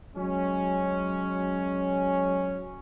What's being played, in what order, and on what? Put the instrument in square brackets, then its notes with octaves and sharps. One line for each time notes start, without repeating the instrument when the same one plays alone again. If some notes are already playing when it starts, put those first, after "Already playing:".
[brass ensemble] F#3 G#3 C#4